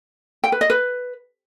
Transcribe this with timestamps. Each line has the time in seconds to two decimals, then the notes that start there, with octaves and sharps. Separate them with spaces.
0.44 G5
0.52 B4
0.61 D#5
0.70 B4